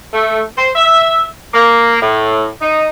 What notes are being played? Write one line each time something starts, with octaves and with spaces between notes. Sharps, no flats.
A3
C5
E5
A#3
A2
D#4